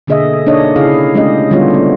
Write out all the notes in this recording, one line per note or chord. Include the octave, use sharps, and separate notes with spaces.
B2 D3 A#3 G#4 D#5 E5
A#3 D4 D#4 C#5 D#5
C#3 E4 G#4 F5
G#3 A3 C#4 D4 G4 D#5
D3 G3 B3 D4 F4 C#5
B3 C4